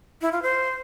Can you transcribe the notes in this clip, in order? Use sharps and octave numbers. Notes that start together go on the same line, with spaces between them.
E4
F4
C5